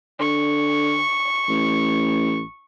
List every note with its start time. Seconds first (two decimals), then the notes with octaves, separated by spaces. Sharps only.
0.20 D3 C#6
1.49 A1